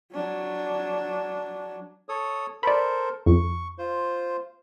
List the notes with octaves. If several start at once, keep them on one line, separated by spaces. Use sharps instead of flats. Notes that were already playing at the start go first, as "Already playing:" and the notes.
F#3 D4
A4 C#5 D#6
A4 A#4 C5 D5 B5
F2 C#6
F4 C5